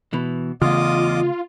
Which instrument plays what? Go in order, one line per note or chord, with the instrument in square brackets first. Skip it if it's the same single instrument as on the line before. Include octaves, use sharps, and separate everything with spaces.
[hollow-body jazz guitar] B2 E3
[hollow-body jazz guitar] E2 [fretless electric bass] C#3 A3 [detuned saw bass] F4 [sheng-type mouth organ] D#5 D6 D#6